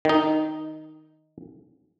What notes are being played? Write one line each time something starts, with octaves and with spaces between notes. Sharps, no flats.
D#3 D#4